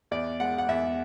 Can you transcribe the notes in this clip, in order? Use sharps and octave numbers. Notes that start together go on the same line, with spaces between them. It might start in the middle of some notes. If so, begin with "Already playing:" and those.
E2 D5
G#3 F#5
F#5
E2 E5